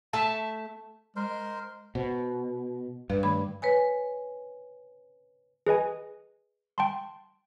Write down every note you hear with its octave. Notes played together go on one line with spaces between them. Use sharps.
A3 E5 A5
G#3 A#4 C5
B2 C5
G2 B4 F5
D#3 A3 B5
B4 C#5 G#5
G#4 B4 D#5 G#5
G5 A5 C6